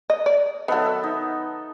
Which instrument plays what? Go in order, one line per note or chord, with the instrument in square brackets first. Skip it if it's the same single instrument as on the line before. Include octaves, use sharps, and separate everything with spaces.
[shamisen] D#5
D5
[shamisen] D#3 F#3 [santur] B3 A4 E5
[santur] E5 C#6 E6
D#4